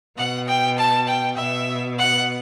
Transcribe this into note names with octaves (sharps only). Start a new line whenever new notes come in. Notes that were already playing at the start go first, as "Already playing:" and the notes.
B2 F#5
G5
A5
G5
B2 E5
F#5